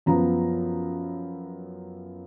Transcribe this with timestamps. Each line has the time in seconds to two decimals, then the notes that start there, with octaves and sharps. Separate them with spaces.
0.06 F#2 F3 B3 A#5